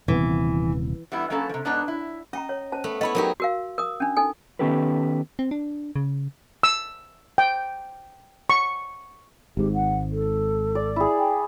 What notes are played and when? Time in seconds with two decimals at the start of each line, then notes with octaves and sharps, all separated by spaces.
0.08 D#1 C3 E3 B3
1.12 E3 G3 B3 E4
1.30 F#3 A#3 C#4 A4 B4
1.49 C3 F3
1.65 G#2 B3 D4 D#4 B4 C#5
1.88 E4
2.33 C#4 D#5 G5 A#5
2.49 C#5
2.72 C#4 C5 A5
2.84 A3 B3
3.01 B3 E4 C#5 D#5 B5
3.15 F#3 D#4 G4 A#4
3.40 F#4 A#4 F5
3.78 A#4 D#6
4.00 C#4 D4
4.17 D#4 A4 G#5
4.59 D#3 B3 C#4 G4 A4 B4
5.39 C4
5.51 D4
5.96 C#3
6.63 E6
7.38 G5
8.50 C#6
9.57 G#1 G#2 G4
9.74 F#5
10.12 A4
10.75 D5
10.96 E4 G#4
11.19 G5